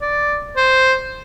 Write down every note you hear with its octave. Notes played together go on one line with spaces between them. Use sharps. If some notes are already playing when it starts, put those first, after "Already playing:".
D5
C5